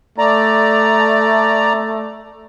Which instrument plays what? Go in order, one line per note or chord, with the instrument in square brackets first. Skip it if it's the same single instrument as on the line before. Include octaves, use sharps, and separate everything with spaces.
[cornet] A3 [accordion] D5 A#5